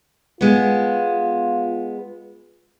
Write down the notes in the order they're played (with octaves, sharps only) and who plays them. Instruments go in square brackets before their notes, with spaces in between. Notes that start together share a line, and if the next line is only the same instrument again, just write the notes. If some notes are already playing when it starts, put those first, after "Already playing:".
[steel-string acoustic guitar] G#3 B3 [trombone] F4